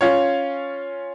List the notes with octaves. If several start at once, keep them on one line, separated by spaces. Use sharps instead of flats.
C#4 F4 C#5